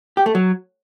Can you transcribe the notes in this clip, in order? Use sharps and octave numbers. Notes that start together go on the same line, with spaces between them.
G4
A3
F#3